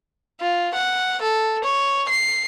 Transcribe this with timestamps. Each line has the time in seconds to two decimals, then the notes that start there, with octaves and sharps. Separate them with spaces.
0.41 F4
0.74 F#5
1.21 A4
1.64 C#5
2.09 C7